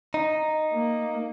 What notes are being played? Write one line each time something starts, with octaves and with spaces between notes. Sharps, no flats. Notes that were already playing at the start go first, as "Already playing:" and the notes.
D#4
A#3